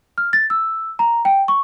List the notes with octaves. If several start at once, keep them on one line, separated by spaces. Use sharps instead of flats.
F6
A6
E6
A#5
G5
C#6